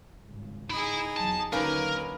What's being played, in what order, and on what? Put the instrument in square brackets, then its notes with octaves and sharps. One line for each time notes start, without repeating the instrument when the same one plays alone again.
[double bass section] G#1 C#2 G2
[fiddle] D#4 G#4 [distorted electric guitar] E4 B5
[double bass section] E2 F#3 [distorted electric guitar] A5
[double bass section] D#2 D3 F#3 [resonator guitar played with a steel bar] A#3 C#4 D#4 [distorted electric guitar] A#4 [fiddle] B4